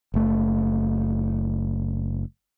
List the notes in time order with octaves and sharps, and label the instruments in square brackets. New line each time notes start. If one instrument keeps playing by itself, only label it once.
[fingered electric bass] F#1 A3